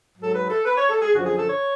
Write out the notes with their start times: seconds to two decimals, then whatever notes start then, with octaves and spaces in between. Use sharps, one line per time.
0.17 G#2 F#3 A4
0.33 B4
0.48 A4
0.64 B4
0.76 C#5
0.89 A4
1.00 G#4
1.13 F#2 D3 F3 F#4
1.24 G#4
1.37 A4
1.48 C#5